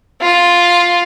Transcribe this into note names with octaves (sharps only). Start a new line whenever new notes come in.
F4